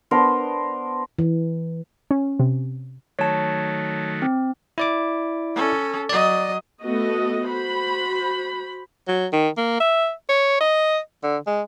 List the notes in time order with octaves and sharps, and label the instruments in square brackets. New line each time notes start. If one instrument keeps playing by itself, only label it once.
[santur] B3 D4 A#4 C5
[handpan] E3
[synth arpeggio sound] C#4
C3
[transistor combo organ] D#3 F#3 A3 [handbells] C#5 A5
[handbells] C4
[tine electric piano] E4 D5 D6
[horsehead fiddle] C#4 A4
[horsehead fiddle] F#3 D#5 [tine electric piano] D5
[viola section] A3 B3 F#4 A4 D#5
F#4 C5 B5
[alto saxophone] F#3
D#3
A#3
E5
C#5
D#5
D3
G#3